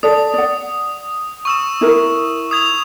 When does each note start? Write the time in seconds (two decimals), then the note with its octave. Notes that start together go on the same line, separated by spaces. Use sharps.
0.03 A4 D5 D#6
0.34 D5 F#5
1.45 C#6 E6 E7
1.81 E4 A#4
2.51 D#6 G#6 F7